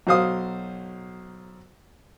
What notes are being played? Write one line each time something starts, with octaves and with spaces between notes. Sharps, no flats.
B1 F#3 C5 F5 D#6